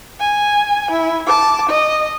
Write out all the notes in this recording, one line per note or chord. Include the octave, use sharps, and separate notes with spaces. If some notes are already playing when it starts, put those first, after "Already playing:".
G#5
E4
A5 D6
D#5